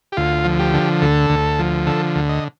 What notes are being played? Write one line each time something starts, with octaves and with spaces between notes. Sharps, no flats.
G4
D2 F4
F3
G4
D3
D2 A4
D2
F3
D3 A4
D2
D#5